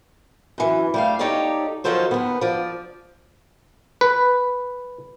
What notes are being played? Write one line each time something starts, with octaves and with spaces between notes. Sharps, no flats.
F#2 E3
G3 A3 F5
D#4 G4 A4 C#5 D5
D#3 F3 F#3 A4 C5 C#5
D#2 B3
F3 D5
B4